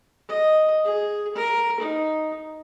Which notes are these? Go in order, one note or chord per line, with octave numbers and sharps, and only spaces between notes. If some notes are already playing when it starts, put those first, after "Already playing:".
D#5
G#4
A#4
D#4